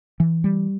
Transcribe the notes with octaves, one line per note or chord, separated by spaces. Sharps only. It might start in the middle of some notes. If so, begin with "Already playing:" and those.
E3
G3